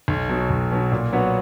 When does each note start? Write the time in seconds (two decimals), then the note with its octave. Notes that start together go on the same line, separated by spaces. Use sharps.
0.08 B1
0.29 B2 F#3
0.50 B1
0.72 B2 F#3
0.92 A#2
1.13 F#3 B3 F#4 C#5